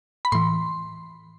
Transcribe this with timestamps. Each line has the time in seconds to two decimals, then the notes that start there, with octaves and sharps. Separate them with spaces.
0.25 B5
0.32 A2 E3 C6